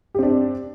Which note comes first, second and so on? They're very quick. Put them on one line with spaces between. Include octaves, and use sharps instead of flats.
G4 C4 D4